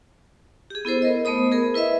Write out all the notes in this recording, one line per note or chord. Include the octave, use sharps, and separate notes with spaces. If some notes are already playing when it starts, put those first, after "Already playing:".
G4 G#4
B3 E4 A4 C5
A#4 D#5
A3 B3 C5 B5 D#6
G#4 A#4
E4 B4 D#5 E5